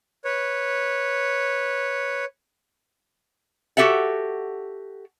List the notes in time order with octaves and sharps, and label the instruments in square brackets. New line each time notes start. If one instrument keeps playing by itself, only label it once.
[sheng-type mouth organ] B4 C#5
[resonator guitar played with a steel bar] F#4 G4 A4 E5 F#5